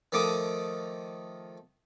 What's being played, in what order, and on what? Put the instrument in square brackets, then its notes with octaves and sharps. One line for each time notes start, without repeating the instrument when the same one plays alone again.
[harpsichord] D#3 F3 A3 D6 D#6